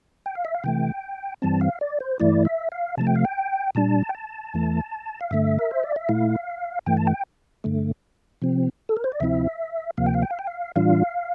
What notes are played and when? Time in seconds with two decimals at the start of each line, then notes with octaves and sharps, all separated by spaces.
0.26 G5
0.35 F5
0.45 E5
0.55 F5
0.64 C3 E3 A3 G5
1.42 G2 E3 G3 C4 A5
1.61 F5
1.81 D5
2.00 C5
2.20 G2 E3 A3 E4 D5
2.45 E5
2.72 F5
2.97 C3 F3 A3 A5
3.07 G5
3.15 F5
3.25 G5
3.75 A#2 G3 D4 A5
4.09 G5
4.15 A5
4.54 E2 E3 A3
5.21 F5
5.31 G2 D3 A3 E5
5.59 A#4
5.71 C5
5.83 D5
5.96 E5
6.09 A#2 A3 E4 F5
6.86 G2 E3 A3 G5
6.97 A5
7.07 G5
7.64 G2 D3 A3
8.42 C3 F3 C4
8.89 A4
8.97 A#4
9.04 C5
9.12 D5
9.20 D2 C3 F3 C4 E4 E5
9.97 D2 C3 F3 A#3 F5
10.06 G5
10.14 F5
10.22 G5
10.31 F5
10.39 G5
10.47 F5
10.76 A2 E3 G3 D4 F4 F5